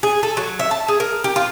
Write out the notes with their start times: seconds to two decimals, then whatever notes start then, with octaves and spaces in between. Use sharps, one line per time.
0.03 G#4
0.23 A4
0.37 F#3
0.59 E5
0.71 A5
0.88 G#4
1.00 A#4
1.24 G4
1.36 F4